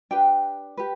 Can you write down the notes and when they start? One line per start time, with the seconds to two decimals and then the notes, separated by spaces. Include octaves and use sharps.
0.11 D4 G4 B4 G5
0.77 G4 B4